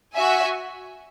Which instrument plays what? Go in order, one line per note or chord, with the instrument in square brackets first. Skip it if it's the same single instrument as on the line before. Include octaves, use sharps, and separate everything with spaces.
[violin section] F#4 E5 G#5